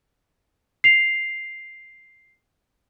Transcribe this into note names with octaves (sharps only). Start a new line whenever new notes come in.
C7 F7